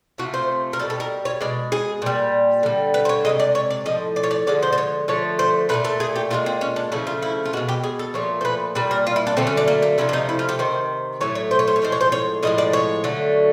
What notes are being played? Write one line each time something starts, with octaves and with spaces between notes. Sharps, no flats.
C3 F3 A3 F#4
C5
A#4
B2 G3 A4
A4
A#4
C#5
B2 G#3 D5
G#4
A#2 G3
D3 G3
B4
C5
C#5
C3 E3 G#3 D#5
D5
C#5
D5
A2 F3 D#5
D5
C#5
D5
D3 F3 G#3 D5
C5
C5
C#5
D3 F3 A3 C#5
C5
A#2 F#3 A3 B4
A4
G#4
G4
A#2 F3 G#3 F4
C4
C#4
D4
C#3 F3 A3 E4
F4
E4
F4
B2 G#3 F#4
G4
G#4
A4
A#2 F3 A3 C#5
C5
B4
A#2 G3 B4
A#4
F4
E4
D4
D3 F#3 A3 C4
C#4
D4
A#3
A#3
C3 F3 A3 E4
D4
D#4
E4
F4
G4
C3 D#3 C5
A2 F#3 A3 C#5
C#5
C5
C#5
C5
C#5
A2 F3 G#3 C5
C#5
C5
C#5
A2 F3 G#3 D#5
D5
C#5
D3 F#3 A3